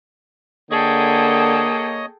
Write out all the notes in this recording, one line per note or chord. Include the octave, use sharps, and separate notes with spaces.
D3 A#3 G#4 A4 C#5 D#5 G5 D#6